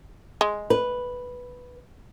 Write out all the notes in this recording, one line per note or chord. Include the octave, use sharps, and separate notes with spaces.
G#3
B4